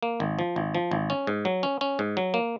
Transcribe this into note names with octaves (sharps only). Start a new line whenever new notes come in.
A#3
G#1
F3
G#1
F3
G#1
C#4
G#2
F#3
C#4
C#4
G#2
F#3
A#3